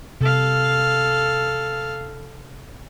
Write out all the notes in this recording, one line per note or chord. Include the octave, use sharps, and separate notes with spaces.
C3 A4 F5